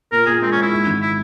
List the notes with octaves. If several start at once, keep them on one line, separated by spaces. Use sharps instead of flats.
A#2 A#4
A#2 G#4
G#3 C4
C#4
G#3
E4
G#2
G#1
E4